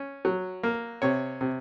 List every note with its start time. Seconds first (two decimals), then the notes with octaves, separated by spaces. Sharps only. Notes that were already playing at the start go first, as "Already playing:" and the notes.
Already playing: C#4
0.25 F#3
0.63 A#3
1.02 C3 C#5
1.41 C3